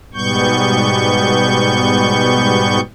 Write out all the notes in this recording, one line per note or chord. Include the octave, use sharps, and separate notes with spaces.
G#2 B2 G3 B3 C#6 G6